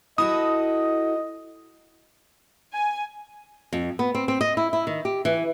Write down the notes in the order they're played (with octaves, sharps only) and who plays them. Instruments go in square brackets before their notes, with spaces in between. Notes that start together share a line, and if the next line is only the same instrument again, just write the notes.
[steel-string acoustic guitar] E4 F#4 A4 [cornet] D#5 [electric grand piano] D#6
[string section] G#5
[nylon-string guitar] F2
B3
C4
C4
D#5
E4
E4
D#3
G4
E3